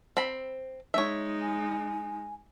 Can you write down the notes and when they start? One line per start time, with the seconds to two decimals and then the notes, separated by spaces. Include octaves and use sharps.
0.17 C4 B5
0.94 G#3 D#4 C#5 E5
1.42 G#5